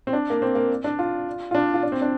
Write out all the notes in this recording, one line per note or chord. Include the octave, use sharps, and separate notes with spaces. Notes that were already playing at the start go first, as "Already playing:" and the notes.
C4
D4
A#3
C4
A#3
D4
F4
F4
D4
F4
D4
C4
D4